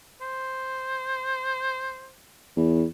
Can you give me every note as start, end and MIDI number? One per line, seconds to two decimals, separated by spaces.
0.21 2.11 72
2.57 2.84 40